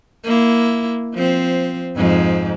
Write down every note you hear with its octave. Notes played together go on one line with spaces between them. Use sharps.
A#3 E4
F3 C4
F2 G#2 F3